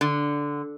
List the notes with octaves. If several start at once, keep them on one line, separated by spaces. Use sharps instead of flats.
D3